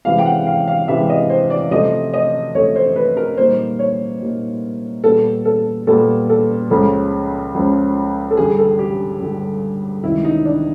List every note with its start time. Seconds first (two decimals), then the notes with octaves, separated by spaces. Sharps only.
0.05 C3 E3 G#3 B3 F5
0.18 G5
0.26 F#5
0.47 F5
0.68 F5
0.88 C3 E3 G#3 B3 E5
1.09 D#5
1.30 C5
1.50 D5
1.71 C3 F3 A3 D#5
2.14 D#5
2.55 C3 F3 A3 C#5
2.76 C5
2.96 B4
3.17 A#4
3.37 A#2 G3 A#3 D#4 C5
3.79 C#5
4.21 A#2 G3 A#3 D#4
5.04 A#2 G3 B3 A4
5.45 A4
5.87 A#2 G3 B3 A4
6.29 A4
6.70 C#2 C#3 F3 A4
7.54 C#2 C#3 F3
8.31 A4
8.37 G2 D3 G3 G#4
8.59 A4
8.79 G4
9.21 G2 D3 G3
10.03 C#2 C3 D#3 E4
10.25 D#4
10.45 D4